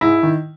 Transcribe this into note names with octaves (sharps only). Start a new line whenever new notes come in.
G#2 E4
D#3